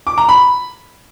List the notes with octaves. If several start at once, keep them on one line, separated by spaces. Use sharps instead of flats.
D6
A#5
B5